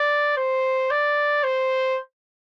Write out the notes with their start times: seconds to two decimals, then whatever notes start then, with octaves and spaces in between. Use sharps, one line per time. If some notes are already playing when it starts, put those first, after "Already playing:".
Already playing: D5
0.37 C5
0.91 D5
1.44 C5